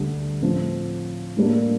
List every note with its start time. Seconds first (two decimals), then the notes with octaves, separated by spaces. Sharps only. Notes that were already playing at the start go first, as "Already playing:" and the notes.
Already playing: D2 D3 G3
0.41 A2 F3 C4
1.36 A2 G3 A#3 D4